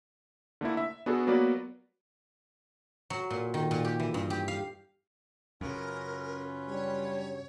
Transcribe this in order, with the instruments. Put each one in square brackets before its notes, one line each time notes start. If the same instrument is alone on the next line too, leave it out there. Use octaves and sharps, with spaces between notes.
[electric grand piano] D3 A3 A#3 E4
E5
B3 D4 F#4 G#4 A4
F#3 A#3 B3 F#4 B4 D5
[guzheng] F#3
A#2
D#3
A#2
G4
E3
G2
G4
F5
[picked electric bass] F#2 C#3 [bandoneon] C#4 F4 B4 [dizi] A#4
[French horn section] G3 D4 [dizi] C#5